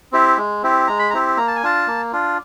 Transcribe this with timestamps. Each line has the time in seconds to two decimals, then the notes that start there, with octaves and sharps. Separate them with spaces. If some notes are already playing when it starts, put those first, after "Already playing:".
0.12 C4 E4 G4
0.37 G#3
0.63 C4 E4 G4
0.87 G#3 A#5
0.99 B5
1.10 A#5
1.13 C4 E4 G4
1.37 A#3 A#5
1.48 A5
1.56 G#5
1.63 D4 F4 A5
1.87 A#3
2.13 D4 F4